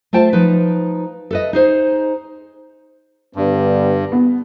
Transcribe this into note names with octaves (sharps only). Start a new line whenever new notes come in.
A3 F4 C5 G5 A5
F3 D#4 B4
A4 B4 D#5
D#4 G#4 C5
G2 D3 G3 B3
B3